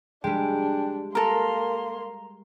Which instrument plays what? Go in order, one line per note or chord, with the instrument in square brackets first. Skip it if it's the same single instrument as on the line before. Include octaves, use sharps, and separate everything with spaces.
[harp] G3 G#3 [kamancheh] D4 [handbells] G5
[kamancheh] A#3 C6 [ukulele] A4 A#4 [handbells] A#5